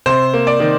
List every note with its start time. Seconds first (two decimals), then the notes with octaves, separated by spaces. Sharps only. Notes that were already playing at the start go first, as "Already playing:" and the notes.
0.06 C3 C5
0.34 A#3
0.47 D5
0.60 D#3